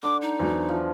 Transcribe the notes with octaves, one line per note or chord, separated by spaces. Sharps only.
D3 D4 D6
D#4
E2 F#3 C5
F3